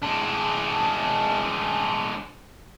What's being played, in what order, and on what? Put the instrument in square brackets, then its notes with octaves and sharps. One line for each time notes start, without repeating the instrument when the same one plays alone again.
[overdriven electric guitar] G#3 D4